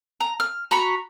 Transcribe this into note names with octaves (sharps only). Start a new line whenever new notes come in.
A#5
F6
F#4 A#5 B5 C#6